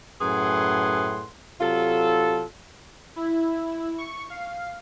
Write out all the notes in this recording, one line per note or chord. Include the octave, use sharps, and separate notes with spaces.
F#2 A2 G#4 B4 F#5 C6
C3 F#3 F4 A4
E4
C#6
F5